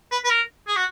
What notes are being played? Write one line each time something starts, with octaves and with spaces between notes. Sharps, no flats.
B4
B4
A#4
G#4
F#4